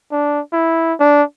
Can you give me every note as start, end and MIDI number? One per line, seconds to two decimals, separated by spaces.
0.12 0.40 62
0.53 0.94 64
1.00 1.23 62